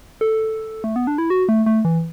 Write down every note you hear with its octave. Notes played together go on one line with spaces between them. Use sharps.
A4
A3
B3
D4
E4
F#4
A3
A3
E3